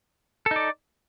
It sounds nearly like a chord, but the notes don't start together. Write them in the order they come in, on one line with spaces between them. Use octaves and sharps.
A4 D#4 D5